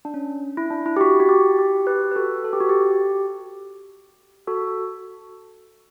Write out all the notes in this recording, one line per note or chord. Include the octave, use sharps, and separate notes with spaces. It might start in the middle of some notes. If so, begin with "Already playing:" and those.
D4
C#4
E4
D4
E4
G4
F#4
F#4
G4
G4
G4 B4
B4
F#4 A4
A4
G4
F#4
G4
F#4 A4